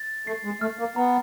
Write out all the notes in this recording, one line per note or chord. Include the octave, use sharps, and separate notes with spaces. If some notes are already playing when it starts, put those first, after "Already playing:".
Already playing: A6
A3 C7
G#3
A3 F6
A#3
B3 A#5